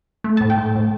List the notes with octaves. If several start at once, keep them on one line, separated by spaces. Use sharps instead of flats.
A3
A5
A2
G5
A3
A2